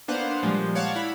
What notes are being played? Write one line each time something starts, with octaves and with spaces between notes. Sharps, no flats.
A#3 B3 D4 C5 F5 F#5
A#2 F3 G3 G#3 A#3
C#5 D5 F5 F#5 A5
E4 B5